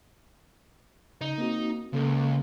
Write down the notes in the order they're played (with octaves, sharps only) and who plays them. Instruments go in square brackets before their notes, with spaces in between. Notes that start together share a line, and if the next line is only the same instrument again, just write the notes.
[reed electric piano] C#3 D#5 [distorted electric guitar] D#4
[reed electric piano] A#3 C4 F#4
[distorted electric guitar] C#2 [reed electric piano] A#3 C#4 A4